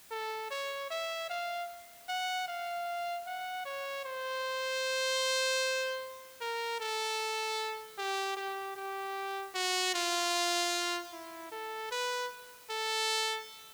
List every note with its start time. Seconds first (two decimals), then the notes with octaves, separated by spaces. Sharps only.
0.11 A4
0.51 C#5
0.90 E5
1.30 F5
2.09 F#5
2.48 F5
3.26 F#5
3.65 C#5
4.05 C5
6.41 A#4
6.80 A4
7.98 G4
8.37 G4
8.76 G4
9.55 F#4
9.94 F4
11.13 E4
11.52 A4
11.91 B4
12.70 A4